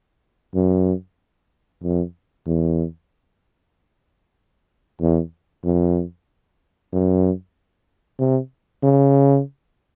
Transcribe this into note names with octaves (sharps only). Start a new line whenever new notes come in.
F#2
F2
E2
E2
F2
F#2
C3
C#3